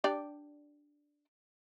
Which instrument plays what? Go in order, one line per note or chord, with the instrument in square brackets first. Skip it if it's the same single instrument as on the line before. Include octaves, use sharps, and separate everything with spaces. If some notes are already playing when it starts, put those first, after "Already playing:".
[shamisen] D4 G4 D5